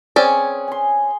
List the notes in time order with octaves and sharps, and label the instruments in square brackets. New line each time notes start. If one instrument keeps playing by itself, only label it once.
[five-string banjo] C4 C#4 D5 [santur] G#4 B4
[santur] G#5 C6